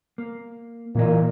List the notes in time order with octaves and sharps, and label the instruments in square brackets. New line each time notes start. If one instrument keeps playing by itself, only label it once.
[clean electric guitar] A#3
[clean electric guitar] B1 E3 D#5 [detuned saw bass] A#2 [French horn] A#3